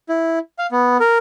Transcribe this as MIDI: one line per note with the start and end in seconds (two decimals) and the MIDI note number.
0.09 0.39 64
0.59 0.67 77
0.72 0.97 59
1.00 1.18 70